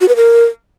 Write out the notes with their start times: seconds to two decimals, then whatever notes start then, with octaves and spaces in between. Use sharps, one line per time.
0.01 F#4
0.08 B4
0.16 A#4